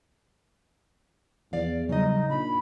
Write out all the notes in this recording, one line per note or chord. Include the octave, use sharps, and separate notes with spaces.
E2 F3 D5 F5
C#3 F#3 G3 D#4 D#5
A#2 D4 D#4 B5